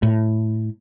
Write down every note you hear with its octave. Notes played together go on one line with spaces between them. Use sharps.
A2